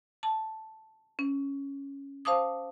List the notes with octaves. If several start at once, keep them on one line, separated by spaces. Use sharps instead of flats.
A5
C#4
C5 F5 A5 D6 D#6